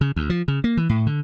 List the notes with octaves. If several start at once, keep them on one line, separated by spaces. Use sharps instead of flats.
C#3
D2
F3
C#3
A#3
E3
A2
D3